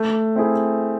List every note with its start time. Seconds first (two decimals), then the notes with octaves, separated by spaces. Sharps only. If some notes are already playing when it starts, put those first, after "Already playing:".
Already playing: A3
0.36 C4 E4 G#4